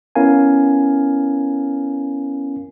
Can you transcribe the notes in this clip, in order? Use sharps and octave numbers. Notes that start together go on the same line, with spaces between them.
B3 C#4 E4 A#4 F5 G#5